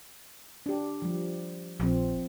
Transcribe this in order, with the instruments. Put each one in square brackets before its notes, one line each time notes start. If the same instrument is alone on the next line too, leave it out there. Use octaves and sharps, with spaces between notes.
[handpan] D4 G4
F3 G3
[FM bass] A#1 [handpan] F3 C4